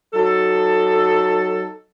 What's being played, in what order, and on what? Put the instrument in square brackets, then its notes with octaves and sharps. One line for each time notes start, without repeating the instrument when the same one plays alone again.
[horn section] F#3 D#4 A4